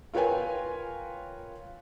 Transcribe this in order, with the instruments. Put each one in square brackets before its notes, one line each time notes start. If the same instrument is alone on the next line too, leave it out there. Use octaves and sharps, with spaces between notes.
[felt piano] F4 A#4 B4 C#5 G5 G#5